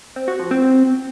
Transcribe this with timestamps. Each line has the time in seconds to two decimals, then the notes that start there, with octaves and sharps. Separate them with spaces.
0.16 C4
0.28 F#4
0.39 F3
0.51 C4